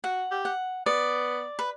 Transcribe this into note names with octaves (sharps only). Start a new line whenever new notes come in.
F#4 F#5
G4
F#5
B3 D5
B4